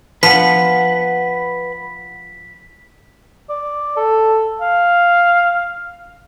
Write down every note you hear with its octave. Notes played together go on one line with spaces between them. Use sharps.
F3 B4 F#5 B6
D5
A4
F5